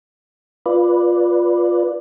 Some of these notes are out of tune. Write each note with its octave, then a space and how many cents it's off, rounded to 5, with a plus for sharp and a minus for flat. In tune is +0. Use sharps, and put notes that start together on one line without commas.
F4 +5 B4 +0 D5 +0